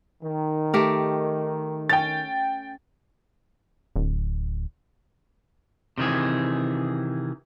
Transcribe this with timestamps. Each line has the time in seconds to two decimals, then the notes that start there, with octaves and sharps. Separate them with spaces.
0.23 D#3
0.74 A3 G4 A#4
1.89 C#4 G5 A6
3.96 D1
5.98 C3 D#3 E3 G#4